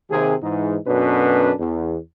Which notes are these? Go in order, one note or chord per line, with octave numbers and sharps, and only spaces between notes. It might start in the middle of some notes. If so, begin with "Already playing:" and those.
D#2 C3 G#4
G#2 E3 D#4
F#2 B2 C#4 D4 A4 B4
E2